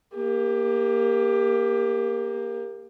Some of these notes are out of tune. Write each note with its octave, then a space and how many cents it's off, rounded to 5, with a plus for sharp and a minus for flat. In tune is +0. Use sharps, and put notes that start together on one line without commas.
A#3 +5 G4 +25